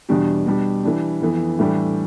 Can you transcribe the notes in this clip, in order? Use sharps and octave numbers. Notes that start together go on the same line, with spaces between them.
E2 B2 G3 D4 G4
B2 G3 D4 G4
E3 G3 D4
F2 E3 B3
A2 E3 G3 D4 G4